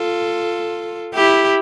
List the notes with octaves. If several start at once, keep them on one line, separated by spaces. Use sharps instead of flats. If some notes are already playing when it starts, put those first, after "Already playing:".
Already playing: F4 A4
E4 G4